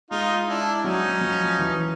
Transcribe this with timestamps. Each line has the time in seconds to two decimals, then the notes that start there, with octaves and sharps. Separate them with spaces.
0.10 G#3 D#4 F4
0.47 D4 E4
0.84 F#3 C#4 D#4
1.21 F3
1.59 E3